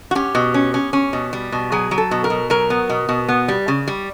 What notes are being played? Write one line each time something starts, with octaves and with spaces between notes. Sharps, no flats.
F#4
C#4 G4
B2
C#4
C#4
C#4
B2
G3
B2
F#3 G#4
F#3
A4
B2
A#4
B2
F#3 A#4
B3
B2
B2
B3
G3
C#3
G3